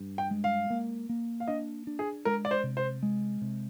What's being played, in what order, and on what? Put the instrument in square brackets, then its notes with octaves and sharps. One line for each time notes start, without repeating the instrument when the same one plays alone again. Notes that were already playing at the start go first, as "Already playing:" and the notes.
Already playing: [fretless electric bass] G2
[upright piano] G5
[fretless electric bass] G#3
[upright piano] F5
[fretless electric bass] A#3
A#3
[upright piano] F5
[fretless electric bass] D4 [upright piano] D#5
[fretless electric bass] D4
[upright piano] G#4
[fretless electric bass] G#3 [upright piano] A#4
[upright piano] D5
C5
[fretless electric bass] C3
[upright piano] C5
[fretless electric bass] G#3
C3